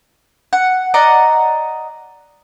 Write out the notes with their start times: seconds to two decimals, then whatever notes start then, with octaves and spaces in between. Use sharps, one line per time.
0.53 F#5
0.94 D5 D#5 F#5 A#5